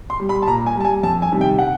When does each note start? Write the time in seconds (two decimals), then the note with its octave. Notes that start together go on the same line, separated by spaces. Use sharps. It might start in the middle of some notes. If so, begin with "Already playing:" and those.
0.10 C6
0.20 G3
0.29 B5
0.42 A5
0.47 A#2 A#5
0.66 G#5
0.76 G3 A5
0.85 G#5
1.03 F2 A5
1.22 G#5
1.32 C3 D#3 G3
1.41 G5
1.59 F#5